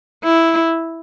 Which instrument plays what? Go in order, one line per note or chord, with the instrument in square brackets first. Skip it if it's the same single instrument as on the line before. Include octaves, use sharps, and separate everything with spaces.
[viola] E4